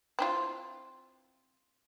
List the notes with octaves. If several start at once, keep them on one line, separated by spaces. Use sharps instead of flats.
C4 E4 F4